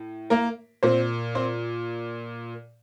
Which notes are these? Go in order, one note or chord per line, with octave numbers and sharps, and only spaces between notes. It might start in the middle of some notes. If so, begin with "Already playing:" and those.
Already playing: A2
A#3 A#4
A#2 C4 C5
C4 C5